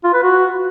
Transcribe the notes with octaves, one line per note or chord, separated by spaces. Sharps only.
F4
B4
F#4